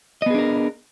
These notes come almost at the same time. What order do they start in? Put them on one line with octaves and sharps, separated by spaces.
D#5 B3 G#4 D4 A#4